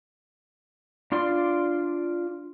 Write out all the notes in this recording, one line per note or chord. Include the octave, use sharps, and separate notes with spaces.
D4 F4 D5 C6